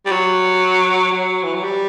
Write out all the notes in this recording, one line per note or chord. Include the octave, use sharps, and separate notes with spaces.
G3
F#3
F#3
E3
F#3
G3